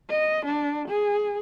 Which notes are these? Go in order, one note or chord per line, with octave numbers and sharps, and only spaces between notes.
D#5
D4
G#4